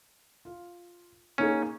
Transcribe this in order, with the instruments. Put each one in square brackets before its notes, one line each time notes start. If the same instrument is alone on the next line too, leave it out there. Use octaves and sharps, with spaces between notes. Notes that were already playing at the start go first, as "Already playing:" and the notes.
[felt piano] F4
[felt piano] A#3 D#4 G#4 [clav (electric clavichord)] C#4